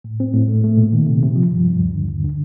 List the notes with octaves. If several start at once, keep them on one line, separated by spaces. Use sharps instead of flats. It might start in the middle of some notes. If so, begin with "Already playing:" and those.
A2
C4
A2
A3
A3
A#2
D#3
C3
C3
F3
G2
G2
D#2
D3
D#2
D3